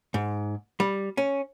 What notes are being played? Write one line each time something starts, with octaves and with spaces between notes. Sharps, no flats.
G#2
G3
C#4